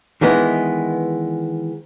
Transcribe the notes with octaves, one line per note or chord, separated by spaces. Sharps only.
D#3 E3 G#3 B3